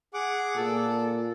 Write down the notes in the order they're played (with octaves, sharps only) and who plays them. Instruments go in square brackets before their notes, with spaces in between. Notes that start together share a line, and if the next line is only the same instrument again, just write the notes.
[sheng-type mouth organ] G#4 F#5 D6
[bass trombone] A#2 [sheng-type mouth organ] A4